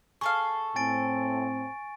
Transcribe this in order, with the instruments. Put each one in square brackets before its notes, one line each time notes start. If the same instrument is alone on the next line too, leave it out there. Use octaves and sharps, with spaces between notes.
[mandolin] G#4 A4 F5 [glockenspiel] C#6
[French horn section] A2 C4 [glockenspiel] G#5 A6 D7